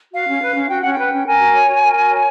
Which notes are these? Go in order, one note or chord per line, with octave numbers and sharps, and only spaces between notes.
F#4 F5
C#4
B4
C#4
F#4 G5
C#4 F#5
B4 G5
C#4
A#4 G#5
F#4
C#5
F#4
A#4
F#4
C#5